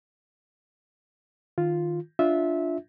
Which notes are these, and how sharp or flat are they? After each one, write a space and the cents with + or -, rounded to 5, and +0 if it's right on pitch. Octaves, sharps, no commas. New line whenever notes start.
D#3 +0 F4 +0
D4 +0 F4 +0 E5 -15